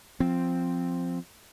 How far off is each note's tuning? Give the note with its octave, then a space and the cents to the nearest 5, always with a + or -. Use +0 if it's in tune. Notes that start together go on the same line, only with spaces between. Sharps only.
F3 +5 C4 +0